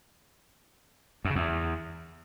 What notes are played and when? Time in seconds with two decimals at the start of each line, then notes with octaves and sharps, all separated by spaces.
1.25 F#2
1.30 C#3
1.35 E2